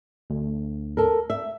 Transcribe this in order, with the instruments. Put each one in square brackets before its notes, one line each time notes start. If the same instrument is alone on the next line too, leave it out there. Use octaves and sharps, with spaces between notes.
[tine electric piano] D2
[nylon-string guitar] A4 A#4
E5